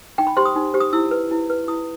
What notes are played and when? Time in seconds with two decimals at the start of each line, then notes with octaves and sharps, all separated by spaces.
0.18 D#4 G5
0.27 B5
0.37 G4 C5 C6
0.45 D#6
0.56 D#4
0.74 G4 C5
0.80 D#6
0.93 E4 E6
1.11 B4
1.31 E4
1.50 B4
1.68 E4 D#6